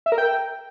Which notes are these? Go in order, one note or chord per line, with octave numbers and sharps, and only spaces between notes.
E5
A#4
G5